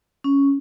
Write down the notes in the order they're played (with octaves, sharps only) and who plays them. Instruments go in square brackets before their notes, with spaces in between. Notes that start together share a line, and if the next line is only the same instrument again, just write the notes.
[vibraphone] C#4